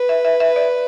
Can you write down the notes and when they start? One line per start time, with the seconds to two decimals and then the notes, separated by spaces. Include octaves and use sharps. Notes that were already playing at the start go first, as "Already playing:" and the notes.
Already playing: B4
0.09 E5
0.25 E5
0.40 E5
0.56 D5